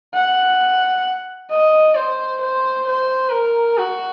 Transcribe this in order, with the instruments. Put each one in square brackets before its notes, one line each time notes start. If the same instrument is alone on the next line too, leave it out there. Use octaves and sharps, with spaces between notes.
[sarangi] F#5
D#5
C5
C5
C5
A#4
F#4